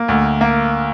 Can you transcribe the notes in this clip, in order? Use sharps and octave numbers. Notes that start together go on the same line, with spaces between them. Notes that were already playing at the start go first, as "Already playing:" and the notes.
Already playing: A#3
D2
A#3